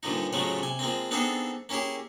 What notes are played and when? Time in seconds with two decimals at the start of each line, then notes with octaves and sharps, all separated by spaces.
0.03 G2 A#2 D3 F3 D#4
0.33 A2 C#3 F3 F#3 G#3 A3
0.59 C3 G#5
0.79 F3 G#3 A#3 C4
1.11 B3 C4 D4 D#4 G#4 A4
1.69 A#3 C#4 E4 G4 G#4